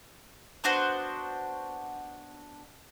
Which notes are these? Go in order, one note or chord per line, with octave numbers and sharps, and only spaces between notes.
B3 D4 F#4 C5